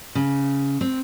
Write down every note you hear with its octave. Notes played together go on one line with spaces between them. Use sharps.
C#3
C4